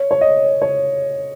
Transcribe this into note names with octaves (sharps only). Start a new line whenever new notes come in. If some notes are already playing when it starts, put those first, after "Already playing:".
Already playing: C#5
C#5
D#5
C#5